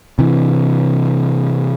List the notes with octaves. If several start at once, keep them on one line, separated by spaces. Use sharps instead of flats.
C3 E3